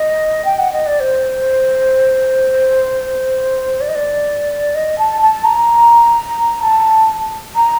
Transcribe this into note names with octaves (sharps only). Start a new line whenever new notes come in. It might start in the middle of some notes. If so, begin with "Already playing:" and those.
Already playing: D#5
G5
F#5
D#5
D5
C5
D5
D#5
D5
D#5
A5
A5
A#5
A5
A#5